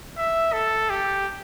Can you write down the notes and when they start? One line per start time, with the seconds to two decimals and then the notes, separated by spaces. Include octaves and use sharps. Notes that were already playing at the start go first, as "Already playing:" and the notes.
0.17 E5
0.53 A4
0.90 G4